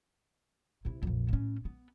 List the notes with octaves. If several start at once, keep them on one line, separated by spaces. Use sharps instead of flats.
C3 E4
A#1 F2
A2 C#4
B3